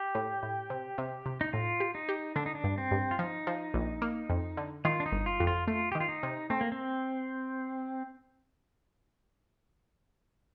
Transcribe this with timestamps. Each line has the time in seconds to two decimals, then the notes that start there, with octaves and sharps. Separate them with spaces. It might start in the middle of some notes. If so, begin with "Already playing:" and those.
Already playing: G4
0.15 A2
0.43 A2
0.70 C3
0.98 C3
1.26 C3
1.41 D#4
1.53 A2 F4
1.80 G4
1.95 D#4
2.09 G4
2.36 D3 D4
2.46 D#4
2.55 D4
2.64 G2
2.78 C4
2.91 G2
3.11 F4
3.19 F3 D#4
3.47 F3
3.74 A#1
4.02 A#3
4.29 F2
4.57 D3
4.85 D#3 F4
5.00 D4
5.06 D#4
5.12 G1
5.26 F4
5.40 F2
5.47 F4
5.67 A3 F4
5.92 G4
5.95 D#3
6.00 F4
6.09 D#4
6.23 C3
6.50 A3 C4
6.61 A#3
6.72 C4